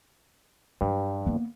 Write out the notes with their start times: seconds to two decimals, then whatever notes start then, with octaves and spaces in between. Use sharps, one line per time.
0.81 G2 F#3
1.26 A#3 B3